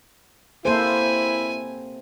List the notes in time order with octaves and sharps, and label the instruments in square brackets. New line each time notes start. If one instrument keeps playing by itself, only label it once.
[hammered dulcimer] C3 [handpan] A#3 A4 C5 [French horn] E4 [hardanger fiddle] G#5